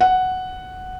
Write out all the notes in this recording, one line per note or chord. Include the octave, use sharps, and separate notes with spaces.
F#5